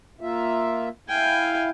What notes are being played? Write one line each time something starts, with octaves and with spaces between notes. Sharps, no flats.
A#3 F4 E5
E4 F5 G5 G#5